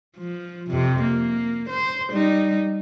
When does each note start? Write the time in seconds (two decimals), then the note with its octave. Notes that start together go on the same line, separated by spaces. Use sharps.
0.17 F3
0.70 F2 C3
1.03 A#3
1.70 C5
2.12 G3 D#4